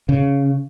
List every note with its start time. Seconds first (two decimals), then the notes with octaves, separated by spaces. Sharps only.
0.09 C#3